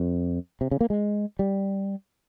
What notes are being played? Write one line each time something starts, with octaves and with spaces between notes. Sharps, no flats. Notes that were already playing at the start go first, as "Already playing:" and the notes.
Already playing: F2
C3
C#3
A#3
G#3
G3